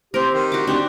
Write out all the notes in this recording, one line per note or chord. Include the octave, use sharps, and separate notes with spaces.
C4 G4 A#4 C5
D#3 C6
F#4 D6
C4 D4 D#4 G4 F#5